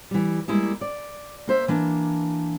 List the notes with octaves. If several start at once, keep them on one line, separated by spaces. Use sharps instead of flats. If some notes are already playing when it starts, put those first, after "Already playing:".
E3 G3
G3 G#3 A#3 E4
D5
A#3 C5 E5
E3 A#3 D4